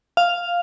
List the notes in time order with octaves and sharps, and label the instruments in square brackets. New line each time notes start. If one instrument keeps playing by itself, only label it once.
[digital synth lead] F5